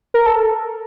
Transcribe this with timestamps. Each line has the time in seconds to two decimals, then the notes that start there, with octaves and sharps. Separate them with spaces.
0.14 A#4
0.26 A4